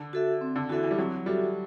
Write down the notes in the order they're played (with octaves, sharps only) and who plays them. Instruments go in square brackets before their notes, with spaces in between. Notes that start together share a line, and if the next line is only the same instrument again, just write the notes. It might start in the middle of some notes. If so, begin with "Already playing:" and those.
Already playing: [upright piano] D3
[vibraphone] F#4 A4 E5
C4
[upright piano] D3
[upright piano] E3 [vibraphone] F#4 A4 E5
[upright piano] E3
G3
[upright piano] F#3 [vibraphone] C4
[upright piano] G3 [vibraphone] F#4 A4 E5